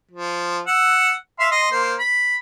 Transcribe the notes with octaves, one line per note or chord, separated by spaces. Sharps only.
F3
F#5 E6
E5 F5 C6
D#5 C6
A#3 C5
B5